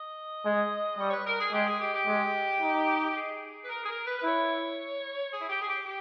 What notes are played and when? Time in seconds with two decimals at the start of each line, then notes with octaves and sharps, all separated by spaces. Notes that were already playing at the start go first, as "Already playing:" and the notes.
Already playing: D#5
0.45 G#3
0.98 G3 C#5
1.09 C#5
1.12 B4
1.26 A#4
1.40 G#4
1.53 G#3 G4
1.66 G#4
1.80 G4
1.93 G4
2.07 G#3
2.61 D#4
3.10 G4
3.14 G#4
3.62 B4
3.68 A#4
3.83 G#4
3.88 A#4
4.05 B4
4.18 B4
4.23 E4 C#5
5.32 G#4
5.41 E4
5.49 G4
5.61 G#4
5.68 G4
5.85 G4